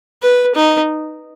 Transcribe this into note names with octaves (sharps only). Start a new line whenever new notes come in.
B4
D#4